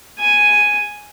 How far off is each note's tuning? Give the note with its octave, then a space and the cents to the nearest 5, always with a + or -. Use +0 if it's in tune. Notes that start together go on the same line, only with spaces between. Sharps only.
G#5 +0